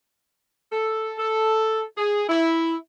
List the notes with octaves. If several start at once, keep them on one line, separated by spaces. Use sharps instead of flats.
A4
A4
G#4
E4